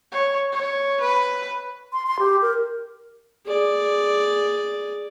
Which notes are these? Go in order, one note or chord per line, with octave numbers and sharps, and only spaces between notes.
C#5
C#5
B4
C6
C6
G4
A#4
G#4 D5